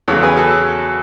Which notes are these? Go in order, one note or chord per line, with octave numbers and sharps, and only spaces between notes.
E2 C#3 F#3 A4 C#5
G#4 B4
F#4 A4